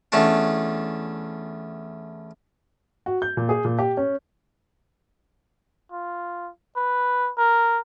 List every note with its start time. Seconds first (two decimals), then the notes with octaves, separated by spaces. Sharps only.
0.12 E2 A3 C#4 D4
3.06 F#4
3.22 G6
3.37 A#2
3.49 G#4
3.65 A#2
3.79 G4
3.97 C#4
5.92 F4
6.76 B4
7.38 A#4